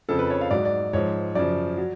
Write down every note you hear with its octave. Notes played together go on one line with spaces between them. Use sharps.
F2 C#3 F3 A4
B4
C#5
F5
G#2 F#3 D5
D5
G#2 F3 C#5
F#2 C#3 F3 D5
F#3